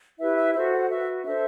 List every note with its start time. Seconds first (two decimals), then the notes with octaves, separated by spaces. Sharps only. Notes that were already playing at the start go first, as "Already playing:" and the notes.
0.19 E4 G4 B4 E5
0.37 E5
0.54 F#4 A4 C5 E5
0.72 F#5
0.90 F#4 B4 E5
1.25 D4 A4 C5 E5